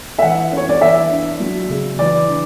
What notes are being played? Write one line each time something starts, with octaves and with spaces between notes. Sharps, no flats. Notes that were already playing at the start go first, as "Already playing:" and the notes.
E5
E3 F#5
C#4 C#5
D5
E3 E5
D4
F#3
C#3
E3 D5
D4